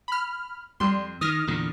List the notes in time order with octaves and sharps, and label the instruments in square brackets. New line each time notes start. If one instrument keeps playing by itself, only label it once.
[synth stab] B5 F6
[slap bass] F2 [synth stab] G3 C6
[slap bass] D#3 [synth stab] D#6 F6 A#6
[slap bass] E2 A#2 D3